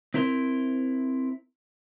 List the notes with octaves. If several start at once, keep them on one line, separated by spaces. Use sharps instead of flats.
C4 E4 A#4 C5